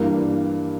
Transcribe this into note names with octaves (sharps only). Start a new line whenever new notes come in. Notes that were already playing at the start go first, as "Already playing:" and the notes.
Already playing: G2 E3 G3 A#3